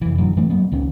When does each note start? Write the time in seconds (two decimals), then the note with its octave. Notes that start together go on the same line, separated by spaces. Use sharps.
0.02 F1 E3
0.18 F#2 D3 E3 F#3
0.37 G2 E3 A3 B3
0.50 F#3 A#3 B3
0.72 C#2 D#3 C#4